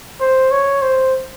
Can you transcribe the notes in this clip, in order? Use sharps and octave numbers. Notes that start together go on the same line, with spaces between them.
C5
C#5
C5